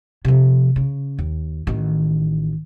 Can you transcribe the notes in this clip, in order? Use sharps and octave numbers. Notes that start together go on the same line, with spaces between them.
C3 F3
C#3
D#2
A1 D#3